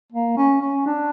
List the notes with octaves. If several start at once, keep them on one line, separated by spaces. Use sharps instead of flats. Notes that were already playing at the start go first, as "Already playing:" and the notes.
A#3
C#4
C#4
D4